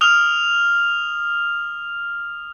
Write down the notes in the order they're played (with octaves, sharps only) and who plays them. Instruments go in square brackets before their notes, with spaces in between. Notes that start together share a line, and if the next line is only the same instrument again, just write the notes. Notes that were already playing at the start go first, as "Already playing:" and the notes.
[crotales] D#6 F6 F7